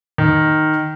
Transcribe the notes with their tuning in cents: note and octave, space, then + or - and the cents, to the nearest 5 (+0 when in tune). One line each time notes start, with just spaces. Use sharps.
D#3 -5